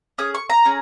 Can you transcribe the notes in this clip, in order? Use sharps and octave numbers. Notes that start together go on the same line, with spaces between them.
C#4 G#4 D#6
C#6
A#5
C#4 G#4